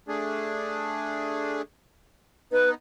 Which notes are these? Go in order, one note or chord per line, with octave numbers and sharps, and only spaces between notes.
A3 D4 G#4
B3 D#4 B4